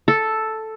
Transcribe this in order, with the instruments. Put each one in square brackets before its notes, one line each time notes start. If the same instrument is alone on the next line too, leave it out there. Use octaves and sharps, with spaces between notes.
[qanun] A4